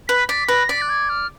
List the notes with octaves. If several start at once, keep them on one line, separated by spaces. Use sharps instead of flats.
B4 B6
D5 B6
B4 A#6
D5 B6
F#6
G#6
F6